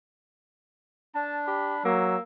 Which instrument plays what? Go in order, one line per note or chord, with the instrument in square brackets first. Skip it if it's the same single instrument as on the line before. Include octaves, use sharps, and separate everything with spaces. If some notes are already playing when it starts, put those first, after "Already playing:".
[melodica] D4 [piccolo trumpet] A5
[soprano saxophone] G4 [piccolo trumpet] B5
[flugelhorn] F#3 [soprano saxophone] A#3 [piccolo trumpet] E6